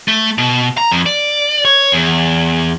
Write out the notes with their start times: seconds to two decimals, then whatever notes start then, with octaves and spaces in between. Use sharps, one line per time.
0.08 A3
0.38 B2
0.77 A#5
0.91 F2
1.06 D5
1.65 C#5
1.92 E2